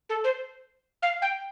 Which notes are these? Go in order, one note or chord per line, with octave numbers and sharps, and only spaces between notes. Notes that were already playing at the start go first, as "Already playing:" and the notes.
A4
C5
F5
G5